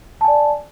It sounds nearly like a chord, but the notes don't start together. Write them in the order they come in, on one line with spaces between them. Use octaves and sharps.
A5 G#5 D5